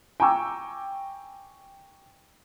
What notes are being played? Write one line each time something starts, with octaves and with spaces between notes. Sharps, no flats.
G5 G#5 A#5 C#6 D6 E6